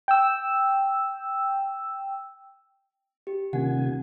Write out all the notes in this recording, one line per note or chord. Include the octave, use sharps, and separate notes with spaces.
G5 E6
G4
D#1 C3 D#3 F#5 G#5